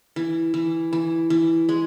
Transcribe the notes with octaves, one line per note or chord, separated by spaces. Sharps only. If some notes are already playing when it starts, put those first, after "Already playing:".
E3
E3
E3
E3
G#3